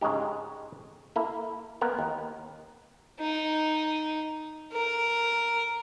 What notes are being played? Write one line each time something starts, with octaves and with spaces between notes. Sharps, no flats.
G#2 C#3 G#3 D4 D#4 G4
A#3 E4 A4
A#3 B3 A#4
D#2
D#4
A#4